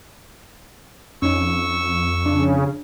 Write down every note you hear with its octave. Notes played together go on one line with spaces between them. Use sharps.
F2 C#4 D#4 C#6 E6
C#3 D4